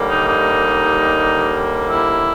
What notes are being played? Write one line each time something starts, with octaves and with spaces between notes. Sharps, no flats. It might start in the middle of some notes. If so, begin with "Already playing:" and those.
Already playing: D#2 D3 G3 A#3
D#4
D#4
E4